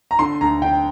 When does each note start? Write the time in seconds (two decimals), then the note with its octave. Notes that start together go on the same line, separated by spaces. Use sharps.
0.11 A#5
0.19 D3 C6
0.41 D2 A#5
0.62 D3 G5